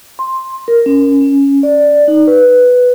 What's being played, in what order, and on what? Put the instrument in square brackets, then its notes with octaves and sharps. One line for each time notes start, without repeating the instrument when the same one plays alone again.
[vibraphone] C6
A#4
C#4
C#4
D5
D#4
B4